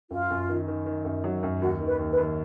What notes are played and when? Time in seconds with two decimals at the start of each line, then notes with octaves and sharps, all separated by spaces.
0.11 F#2 F4
0.30 F#2
0.49 D#3
0.68 D#3
0.86 D#3
1.05 F#2
1.24 F#3
1.43 F#2
1.62 D#2 F#4
1.80 D#3
1.87 B4
1.99 D#2
2.12 B4
2.18 D#2